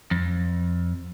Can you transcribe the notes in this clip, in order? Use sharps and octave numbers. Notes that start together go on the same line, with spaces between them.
F2